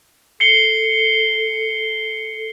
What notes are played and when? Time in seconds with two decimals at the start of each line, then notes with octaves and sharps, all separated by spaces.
0.40 A4 C7 C#7 G7